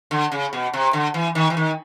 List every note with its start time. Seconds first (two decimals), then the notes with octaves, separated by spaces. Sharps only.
0.11 D3
0.32 C#3
0.53 B2
0.73 C3
0.93 D3
1.14 E3
1.35 D#3
1.50 E3
1.57 D#3